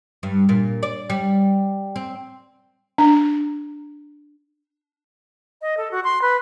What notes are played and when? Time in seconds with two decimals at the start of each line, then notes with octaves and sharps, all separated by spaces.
0.23 G2
0.49 A#2
0.83 D5
1.10 G3
1.96 C4
2.98 D4
5.62 D#5
5.77 A4
5.91 F#4
6.04 C6
6.22 B4